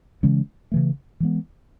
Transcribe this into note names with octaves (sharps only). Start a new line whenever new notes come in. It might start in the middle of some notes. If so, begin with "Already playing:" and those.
C#3 E3 G#3 C#4
C#3 E3 A3
E3 G#3 B3